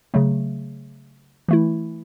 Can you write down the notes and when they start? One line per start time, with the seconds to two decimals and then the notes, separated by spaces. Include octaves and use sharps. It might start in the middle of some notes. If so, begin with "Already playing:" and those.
0.14 C#3 F#3 A3
1.48 E3 A3 E4